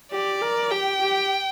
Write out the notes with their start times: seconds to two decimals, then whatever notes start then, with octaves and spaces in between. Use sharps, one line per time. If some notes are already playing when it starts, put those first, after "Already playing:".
0.12 G4 D5
0.42 A#4
0.71 G4 G5
1.01 G4